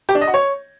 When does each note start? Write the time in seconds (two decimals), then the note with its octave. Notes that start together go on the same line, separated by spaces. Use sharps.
0.09 G4
0.15 D4
0.21 D#5
0.28 F#4
0.34 C#5